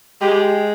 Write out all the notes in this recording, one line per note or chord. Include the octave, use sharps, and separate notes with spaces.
G#3 G4